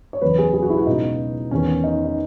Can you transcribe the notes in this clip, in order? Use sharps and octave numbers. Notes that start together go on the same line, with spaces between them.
C#5
F#1 E2 C#3 E3 B4
G#4
G#4
F#4
E4
F#4
C#2 B2 D#4
E1 E2 D#3 C#4
D#4
D#4